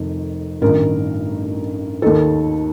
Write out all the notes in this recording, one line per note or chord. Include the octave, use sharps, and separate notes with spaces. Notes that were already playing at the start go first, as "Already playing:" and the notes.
Already playing: F1 F2 D#3
A1 G2 D#3 A#4
D#2 D#3 A4